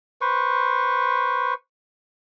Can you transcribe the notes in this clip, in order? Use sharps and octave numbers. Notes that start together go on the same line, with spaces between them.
B4 C5 C#6